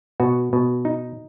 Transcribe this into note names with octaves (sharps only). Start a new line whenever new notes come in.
B2 F#4
B2
D#4